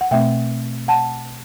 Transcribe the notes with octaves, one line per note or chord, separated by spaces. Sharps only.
F#5
B2 A3 C4 E5 G5
F#5 A5